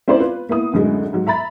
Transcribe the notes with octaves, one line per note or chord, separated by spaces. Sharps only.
C4 C#4 E4 C5 D5 C6
F4 B4
A#3 B3 E4 D#6
F#2 A2 D3 F#3 G#3
G#2 F#3
E5 A#5 B5 A6